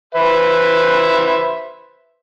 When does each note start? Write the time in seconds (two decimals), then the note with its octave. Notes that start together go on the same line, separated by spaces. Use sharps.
0.14 B4 C5 E5